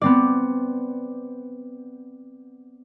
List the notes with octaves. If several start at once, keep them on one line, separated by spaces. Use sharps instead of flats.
B3 C4 D5